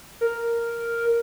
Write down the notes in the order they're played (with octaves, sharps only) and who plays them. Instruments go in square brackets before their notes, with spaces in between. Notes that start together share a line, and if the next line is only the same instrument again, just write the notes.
[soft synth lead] A#4